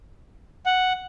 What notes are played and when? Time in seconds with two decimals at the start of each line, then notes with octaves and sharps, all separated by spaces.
0.66 F#5